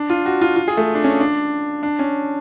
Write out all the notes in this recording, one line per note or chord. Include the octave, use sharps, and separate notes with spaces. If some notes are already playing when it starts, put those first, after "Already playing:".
Already playing: D4
F4
F#4
F4
F4
G#4
A3
D4
C#4
D4
D4
C#4